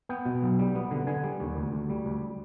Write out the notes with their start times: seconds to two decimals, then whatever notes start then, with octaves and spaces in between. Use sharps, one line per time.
0.09 B3 G5
0.25 B2
0.42 B1
0.59 G3
0.75 B3
0.91 D3
1.07 D3 G#5
1.23 G3
1.40 D#2
1.57 D2
1.72 D2
1.90 G3
2.06 D2